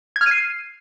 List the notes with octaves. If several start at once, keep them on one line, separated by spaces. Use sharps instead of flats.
G#6
F6
D#7
C7